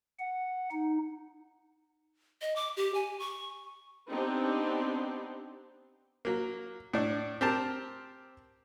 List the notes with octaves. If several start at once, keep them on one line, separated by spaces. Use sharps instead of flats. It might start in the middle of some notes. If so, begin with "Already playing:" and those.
F#5
D#4
D#5
D6
G4
G#5
C#6
B3 C4 D4 D#4 G4
F#3 A#3
A2 D4
C4 G4 A#4 A5